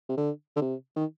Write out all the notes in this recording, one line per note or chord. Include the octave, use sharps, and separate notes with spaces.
C3
D3
D3
C3
D#3